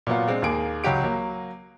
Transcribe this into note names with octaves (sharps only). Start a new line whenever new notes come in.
A#2 F#3 B3 F4
G#3 C4 D4
D#2 A#3 G#4 D7
C#2 F#3 F#4 G4 D7
F#3 A#3